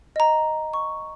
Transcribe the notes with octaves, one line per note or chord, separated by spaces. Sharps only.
D#5 A#5
C#6